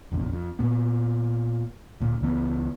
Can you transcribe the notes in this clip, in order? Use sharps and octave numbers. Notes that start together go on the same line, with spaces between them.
F1 A#1 E2
F2
A#2 B3
D1 A#2
C#2 E3 B3